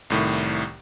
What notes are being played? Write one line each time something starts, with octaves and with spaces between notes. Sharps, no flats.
C2 A2 D#3